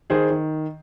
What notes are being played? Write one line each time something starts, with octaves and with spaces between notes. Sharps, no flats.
D#3 G#4 C5
D#3